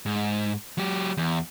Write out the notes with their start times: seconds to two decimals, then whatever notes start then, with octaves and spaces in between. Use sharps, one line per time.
0.06 G#2
0.78 F#3 G4
1.17 E2